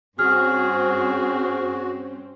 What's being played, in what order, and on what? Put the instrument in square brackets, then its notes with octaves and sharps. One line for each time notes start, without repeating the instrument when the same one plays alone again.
[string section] G2 C4 C#4 [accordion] F#4 [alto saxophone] G#4 [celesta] F6